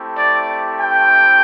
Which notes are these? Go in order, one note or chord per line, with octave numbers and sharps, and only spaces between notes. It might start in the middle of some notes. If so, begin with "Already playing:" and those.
Already playing: A3 C4 E4 G4
D5
G5